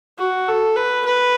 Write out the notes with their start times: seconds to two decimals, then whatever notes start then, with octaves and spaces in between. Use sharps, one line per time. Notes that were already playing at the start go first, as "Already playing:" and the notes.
0.18 F#4
0.48 A4
0.76 B4
1.05 B4